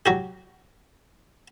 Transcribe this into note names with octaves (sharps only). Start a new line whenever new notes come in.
F#3 F#4 G4